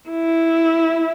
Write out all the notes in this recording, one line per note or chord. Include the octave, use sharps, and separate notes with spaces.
E4